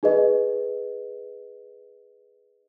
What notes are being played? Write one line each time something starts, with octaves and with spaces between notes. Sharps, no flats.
D#4 G#4 B4 D#5